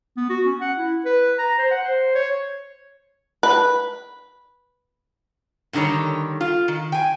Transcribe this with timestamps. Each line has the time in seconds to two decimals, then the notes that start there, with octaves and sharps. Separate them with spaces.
0.17 B3
0.30 F#4
0.46 C#4
0.61 F#5
0.78 E4
1.05 B4
1.39 A#5
1.59 C5
1.71 F#5
1.84 C5
2.15 C#5
3.43 B4
5.73 A#2 D3 D#3 G3 C#5
6.41 F4
6.68 D#3
6.92 G5 G#5